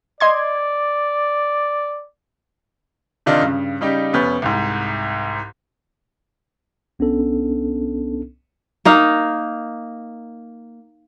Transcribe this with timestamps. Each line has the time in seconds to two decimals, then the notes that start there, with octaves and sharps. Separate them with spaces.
0.20 D5 D#5 C6 G#6
3.26 C3 D#3 D4 D#4 F4
3.42 G2 C#3
3.81 C#3 G3 D#4 G4
4.13 F1 B3 C#4 G6
4.42 C2 G#2
6.99 C2 B3 C#4 D4 A4
8.85 A#3 D#4 F5